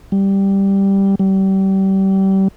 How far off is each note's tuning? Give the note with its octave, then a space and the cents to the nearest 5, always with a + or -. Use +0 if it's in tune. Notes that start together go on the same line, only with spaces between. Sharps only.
G3 +0
G3 -30